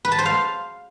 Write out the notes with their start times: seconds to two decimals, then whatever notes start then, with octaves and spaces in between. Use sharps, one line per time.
0.05 B4
0.12 A5
0.19 C5
0.26 F5